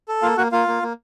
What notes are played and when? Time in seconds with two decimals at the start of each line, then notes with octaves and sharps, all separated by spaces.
0.08 A4
0.22 A#3 F4 F5
0.37 A#3 F#4 F#5
0.52 A#3 F4 F5
0.68 A#3
0.83 A#3